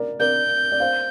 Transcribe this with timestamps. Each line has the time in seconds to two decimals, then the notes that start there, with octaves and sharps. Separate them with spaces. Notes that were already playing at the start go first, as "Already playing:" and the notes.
Already playing: A#4 D5
0.20 A#4 D5 G6
0.72 D5
0.80 C5 F5